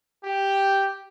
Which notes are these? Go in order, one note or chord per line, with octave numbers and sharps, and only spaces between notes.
G4